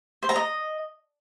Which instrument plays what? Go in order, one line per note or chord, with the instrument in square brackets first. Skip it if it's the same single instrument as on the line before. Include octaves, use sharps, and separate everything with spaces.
[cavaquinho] C5
A#5
D#5